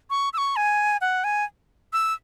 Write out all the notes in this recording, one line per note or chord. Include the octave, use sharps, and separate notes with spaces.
C#6
E6
C#6
G#5
F#5
G#5
E6